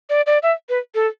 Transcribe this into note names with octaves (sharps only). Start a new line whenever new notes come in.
D5
D5
E5
B4
A4